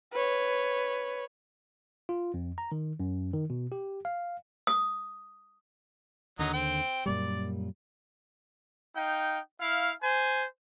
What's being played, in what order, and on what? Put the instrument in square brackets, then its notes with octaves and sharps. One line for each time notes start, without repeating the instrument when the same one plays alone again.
[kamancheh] B4 C#5
[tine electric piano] F4
F2
A#5
D#3
F#2
D#3
B2
G4
F5
[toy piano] D#6
[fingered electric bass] D#2 D3 [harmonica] F#3 D#4
[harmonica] C4 G5
[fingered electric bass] F#2 A#2 G3 [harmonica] D5
[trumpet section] D#4 F5 G5
E4 F5
C5 G#5